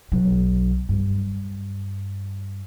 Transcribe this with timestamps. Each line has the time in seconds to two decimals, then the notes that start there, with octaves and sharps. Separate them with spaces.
0.12 B1 F#3
0.89 G2